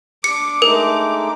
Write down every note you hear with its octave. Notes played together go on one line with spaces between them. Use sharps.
D4 D6 C#7
G#3 A3 D#4 A#4